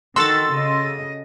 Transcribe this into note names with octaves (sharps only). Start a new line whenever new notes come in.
D#3 F#4 A4 C6 E6 A6
C#3 D#5